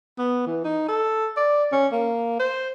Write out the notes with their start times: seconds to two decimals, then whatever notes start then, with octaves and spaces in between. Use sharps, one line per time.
0.19 B3
0.47 E3
0.64 D#4
0.88 A4
1.37 D5
1.72 C#4
1.92 A#3
2.39 C5